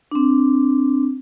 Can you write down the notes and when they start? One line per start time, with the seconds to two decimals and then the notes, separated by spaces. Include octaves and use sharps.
0.11 C4 D4